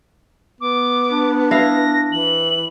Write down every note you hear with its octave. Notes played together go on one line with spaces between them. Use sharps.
B3 D6
D4
E4 F5 A#6
E3 F#7